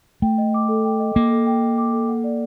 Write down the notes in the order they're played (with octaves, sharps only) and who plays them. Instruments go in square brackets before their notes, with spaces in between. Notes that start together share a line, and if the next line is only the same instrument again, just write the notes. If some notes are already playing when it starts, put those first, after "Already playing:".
[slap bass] A3 [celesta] G5
[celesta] D#5
D6
A4
G5
D#5
[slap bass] A#3 [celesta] D6
[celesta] A4
G5
D#5
D6
A4
F#5
D5